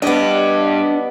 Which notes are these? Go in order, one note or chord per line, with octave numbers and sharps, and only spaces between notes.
G2 B3 D4 G4 D#5